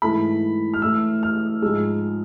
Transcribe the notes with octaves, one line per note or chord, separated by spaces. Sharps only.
G#2 E3 A3 B5
F6
A2 E3 A3 E6
F6
G#2 F3 G#3 E6